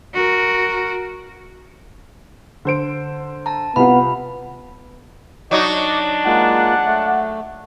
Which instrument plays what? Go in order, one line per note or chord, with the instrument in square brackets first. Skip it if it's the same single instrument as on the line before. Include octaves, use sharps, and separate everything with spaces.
[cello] F#4 A#4
[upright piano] D3 C5 D7
[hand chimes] A5 A#5
[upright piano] C2 F4 [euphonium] B3 [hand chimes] B5
[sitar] F#3 D#4 F#4 [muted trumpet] D4 [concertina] D5 D#5 D6
[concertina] G#3 A#3 F4 [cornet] F#5
[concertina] A3